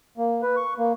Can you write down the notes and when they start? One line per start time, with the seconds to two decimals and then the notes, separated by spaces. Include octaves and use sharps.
0.18 A#3
0.43 B4
0.57 C#6
0.78 A#3